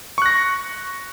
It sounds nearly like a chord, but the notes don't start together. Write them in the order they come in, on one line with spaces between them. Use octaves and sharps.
C#6 F#6 A#6